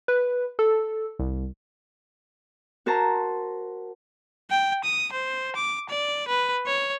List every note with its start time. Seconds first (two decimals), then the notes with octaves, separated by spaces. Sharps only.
0.08 B4
0.59 A4
1.19 C2
2.86 F#4 A#4 C5 A5 A#5
4.50 G5
4.84 D#6
5.12 C5
5.56 D6
5.89 D5
6.28 B4
6.66 C#5